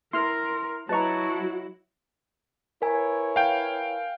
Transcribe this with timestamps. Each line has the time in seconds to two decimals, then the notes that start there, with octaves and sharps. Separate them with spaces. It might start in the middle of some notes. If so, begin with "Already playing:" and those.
0.13 E4 A#4 C6 F6
0.89 F#3 E4 F#4 B4 D#5 A5 A#5 C#6
2.82 E4 A#4 B4 C#5 G#5
3.36 F5 G5